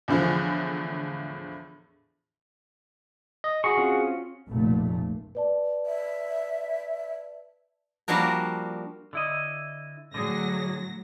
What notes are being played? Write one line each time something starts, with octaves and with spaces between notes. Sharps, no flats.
E2 A2 D3 F3
D#5
F#4 G#4 C#6
C4 C#4 F4
F1 B1 A#2 A3
B4 D5 A5
E5
F3 G3 A#3 D4 F#4 A#4
D3 E4 D#5
A2 D3 F#3 G#4 A#6